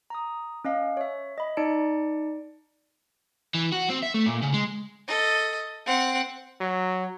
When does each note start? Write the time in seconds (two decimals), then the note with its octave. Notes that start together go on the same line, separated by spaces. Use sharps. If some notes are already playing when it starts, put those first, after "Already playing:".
0.10 A#5 D#6
0.65 C#4 D#5 F5
0.97 C#5 E5
1.38 D#5 B5
1.57 D#4 D5 A5 C#7 D7
3.54 E3
3.72 F#4
3.89 C4
4.02 E5
4.14 A3
4.26 A#2
4.42 C#3
4.54 G#3
5.07 A4 D#5
5.86 C4 F#5
6.61 F#3